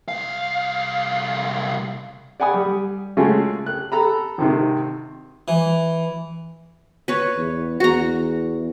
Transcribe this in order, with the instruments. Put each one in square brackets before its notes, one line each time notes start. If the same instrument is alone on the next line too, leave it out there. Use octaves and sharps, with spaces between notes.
[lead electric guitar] C2 F5
[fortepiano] D5 F#5 G#5 B5 D#6
G3
C#3 G#3 A3 F4 F#4 G#4
F#6
A4 A#5 B5
G#1 C3 D#3
[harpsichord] E3
[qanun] B4 C#5
[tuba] E2
[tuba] E2 [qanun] F#4 A#5